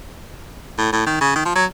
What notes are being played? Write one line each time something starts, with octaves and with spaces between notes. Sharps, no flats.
A2
A2
D#3
C#3
D#3
F3
F#3